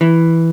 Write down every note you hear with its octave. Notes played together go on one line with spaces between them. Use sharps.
E3